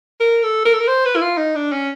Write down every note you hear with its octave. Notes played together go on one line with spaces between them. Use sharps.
A#4
A4
A#4
A4
A#4
C5
B4
E4
F4
D#4
D4
C#4